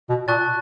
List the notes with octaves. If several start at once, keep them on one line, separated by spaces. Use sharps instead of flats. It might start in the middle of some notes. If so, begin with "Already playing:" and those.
B2
A#2 A5 C#6 F#6 A6